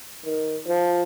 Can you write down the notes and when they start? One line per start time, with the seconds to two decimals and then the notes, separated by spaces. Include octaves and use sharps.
0.25 D#3
0.67 F3